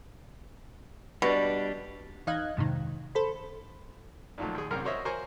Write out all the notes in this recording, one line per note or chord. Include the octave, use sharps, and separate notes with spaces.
B2 G3 D4
E2 D#4 D#5 F5 F#6 G#6
F2 G#2 C3 D#3
A4 C5 B5
A#2 D#3 F3 F#3 A3
D#2 G#4
C2 F#2 C4 A#4 F6
F#4 A#4 C5 C#5 D#5 E5
F#4 A#4 C5 C#5 G#5 C#6